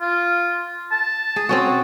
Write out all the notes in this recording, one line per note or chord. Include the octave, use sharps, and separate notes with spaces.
F4
A5
G#4
C4 C#4 F#4